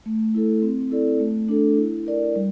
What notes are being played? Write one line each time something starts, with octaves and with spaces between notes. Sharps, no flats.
A3
E4 A4
C4
E4 A4 D5
A3
D4 A4
E4
A#4 D5
G3